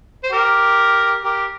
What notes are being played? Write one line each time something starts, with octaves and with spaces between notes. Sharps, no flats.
C5
G4 A#4
G4 A#4